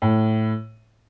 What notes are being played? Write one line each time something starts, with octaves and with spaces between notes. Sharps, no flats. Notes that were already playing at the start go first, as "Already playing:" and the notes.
A2